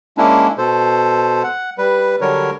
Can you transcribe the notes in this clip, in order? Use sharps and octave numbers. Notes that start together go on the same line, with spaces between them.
G#3 A#3 C#4 D4 E4
B2 A4 C5
F#5
G3 B4
D3 F#3 G3 A#4 C#5